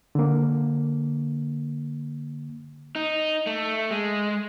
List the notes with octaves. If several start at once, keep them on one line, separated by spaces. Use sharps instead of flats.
D3 A#3
D#4
A3
G#3